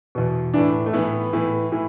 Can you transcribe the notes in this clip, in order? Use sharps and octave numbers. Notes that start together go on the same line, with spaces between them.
E2 B2
A2 E3 D4
A3
A2 E3 B3
A2 E3
A2 E3